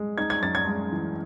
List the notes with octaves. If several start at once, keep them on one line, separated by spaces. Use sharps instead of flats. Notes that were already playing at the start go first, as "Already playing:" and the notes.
Already playing: G#3
D#4 G#6
G#6
F#2 A6
G#6
G#3
E3